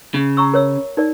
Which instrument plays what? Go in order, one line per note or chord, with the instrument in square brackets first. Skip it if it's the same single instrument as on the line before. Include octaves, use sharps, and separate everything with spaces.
[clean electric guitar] C#3
[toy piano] A#5 C#6 E6
A#4 C#5 E6
D#4 A#4 D5